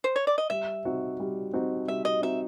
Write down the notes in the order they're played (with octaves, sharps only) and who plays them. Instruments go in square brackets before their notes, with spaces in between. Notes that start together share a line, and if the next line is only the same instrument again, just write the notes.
[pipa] C5
C#5
D5
D#5
[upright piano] G3 [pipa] E5
[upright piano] C4 D#4 F#4
G3
C4 D#4 F#4
[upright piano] G3 [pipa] E5
[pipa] D#5
[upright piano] C4 D#4 F#4 [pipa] E5